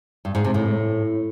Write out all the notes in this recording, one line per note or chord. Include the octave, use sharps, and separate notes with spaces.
G2
G#2
C3
A2